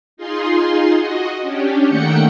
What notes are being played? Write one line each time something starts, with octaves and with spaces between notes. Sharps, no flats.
D#4 F4 G#4 C6
F#4 D#5
C#4 D4 G4
D#3 A3 A#3 F#5 G5 C#7